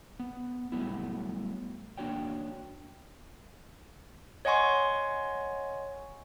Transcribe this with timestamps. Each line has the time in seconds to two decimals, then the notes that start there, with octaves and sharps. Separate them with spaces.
0.19 B3
0.72 F#3 G3 A3 B3 E4
1.98 A#3 D4 F#4 C#5 G5
4.45 C#5 D#5 F#5 G#5 C6 C#6